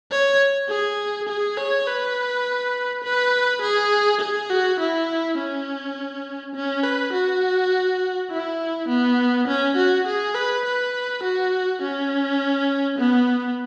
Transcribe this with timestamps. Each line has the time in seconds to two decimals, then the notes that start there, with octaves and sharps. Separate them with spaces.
0.11 C#5
0.69 G#4
1.28 G#4
1.57 C#5
1.87 B4
3.04 B4
3.62 G#4
4.21 G#4
4.50 F#4
4.80 E4
5.38 C#4
6.55 C#4
6.83 B4
7.13 F#4
8.30 E4
8.88 B3
9.47 C#4
9.77 F#4
10.07 G#4
10.35 B4
10.65 B4
11.23 F#4
11.82 C#4
12.98 B3